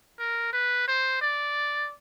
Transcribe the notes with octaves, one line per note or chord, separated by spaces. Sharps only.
A#4
B4
C5
D5